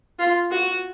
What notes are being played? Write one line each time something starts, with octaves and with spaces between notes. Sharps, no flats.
F4
F#4